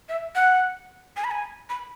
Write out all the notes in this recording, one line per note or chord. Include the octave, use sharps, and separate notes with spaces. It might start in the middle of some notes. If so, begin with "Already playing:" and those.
E5
F#5
G#5
B5
G#5
B5